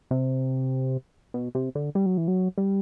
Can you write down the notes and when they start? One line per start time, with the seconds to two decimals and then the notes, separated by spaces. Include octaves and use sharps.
0.11 C3
1.34 B2
1.55 C3
1.75 D3
1.95 G3
2.06 F#3
2.17 E3
2.28 F#3
2.58 G3